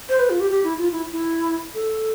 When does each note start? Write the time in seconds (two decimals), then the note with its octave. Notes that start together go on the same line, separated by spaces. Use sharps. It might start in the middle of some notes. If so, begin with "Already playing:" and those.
0.09 C5
0.19 B4
0.30 F4
0.40 G4
0.51 G4
0.64 E4
0.78 F4
0.92 E4
1.12 E4
1.74 A4